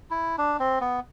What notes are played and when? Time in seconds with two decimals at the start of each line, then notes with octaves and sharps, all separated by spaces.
0.11 E4
0.38 D4
0.60 C4
0.81 B3